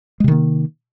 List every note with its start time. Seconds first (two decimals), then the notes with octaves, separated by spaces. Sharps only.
0.20 G#3
0.24 C3
0.28 D#3
0.32 A#3